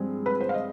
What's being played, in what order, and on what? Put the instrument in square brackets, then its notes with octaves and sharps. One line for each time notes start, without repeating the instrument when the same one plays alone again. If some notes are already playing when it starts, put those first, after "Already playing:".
Already playing: [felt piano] G2 F3 G#3 C4 F4 G#4
B4
C5
F5
D#5